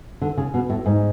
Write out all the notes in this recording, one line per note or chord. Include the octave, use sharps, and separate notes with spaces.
D3
C#3
B2
A2
G#2